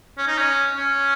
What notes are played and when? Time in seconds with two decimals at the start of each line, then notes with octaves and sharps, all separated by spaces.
0.18 C#4
0.27 D#4
0.38 C#4
0.77 C#4